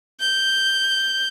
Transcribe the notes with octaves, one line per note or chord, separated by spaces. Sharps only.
G6